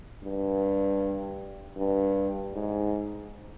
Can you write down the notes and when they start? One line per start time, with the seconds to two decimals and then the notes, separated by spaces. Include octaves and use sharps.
0.23 G2
1.76 G2
2.53 G#2